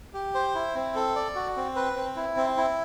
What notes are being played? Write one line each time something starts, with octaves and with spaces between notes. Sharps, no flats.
G4
C5
E4
C4
A4
D5
F#4
C4
B4
C4
E4
C4
E4